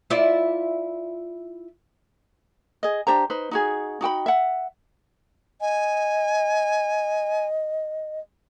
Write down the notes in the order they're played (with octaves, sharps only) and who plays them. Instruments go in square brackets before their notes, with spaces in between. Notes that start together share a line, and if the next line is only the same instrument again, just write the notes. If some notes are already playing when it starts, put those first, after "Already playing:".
[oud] E4 F4 D5
[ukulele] G#4 D#5
D4 G4 C5 A#5
D#4 B4 C5
D#4 F#4 G#4
D#4 F#4 G5 B5
E5 F#5
[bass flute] D#5 [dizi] G#5